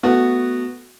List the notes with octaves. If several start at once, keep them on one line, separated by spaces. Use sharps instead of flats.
A3 B3 F#4